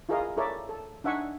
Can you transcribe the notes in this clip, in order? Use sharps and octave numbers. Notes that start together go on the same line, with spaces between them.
E4 F4 G#4 A#4 D#5 F5
E4 A4 A#4 C#5 D5 E5
A4
D4 D#4 E5 F#5 G#5 C#6